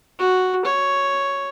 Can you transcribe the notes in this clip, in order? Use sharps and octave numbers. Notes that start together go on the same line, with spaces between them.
F#4
C#5